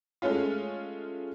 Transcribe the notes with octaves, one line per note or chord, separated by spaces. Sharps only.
G#3 A3 C#4 F4